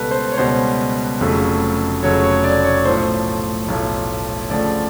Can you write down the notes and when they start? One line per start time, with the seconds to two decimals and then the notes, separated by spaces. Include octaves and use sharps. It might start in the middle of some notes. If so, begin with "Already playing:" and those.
Already playing: C#2 B2 G3 A4 B4
0.11 C5
0.32 C#5
0.38 C#2 B2 G3 C5
1.20 F1 F2 C#3 F#3 A3
2.03 F1 F2 C#3 F#3 A3 C#5
2.23 C#5
2.44 D5
2.65 C#5
2.85 B1 A2 F3 A3 C5
3.68 B1 A2 F3 A3
4.50 D2 C#3 F3 A3 D5